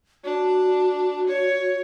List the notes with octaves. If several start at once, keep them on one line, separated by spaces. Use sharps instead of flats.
D4 F#4
C#5